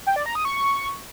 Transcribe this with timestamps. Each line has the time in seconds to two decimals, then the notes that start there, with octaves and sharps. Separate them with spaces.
0.07 G5
0.16 D5
0.26 A#5
0.35 D#6
0.45 C#6